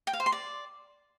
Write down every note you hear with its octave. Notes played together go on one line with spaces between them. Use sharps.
G5
F5
C5
C6
D5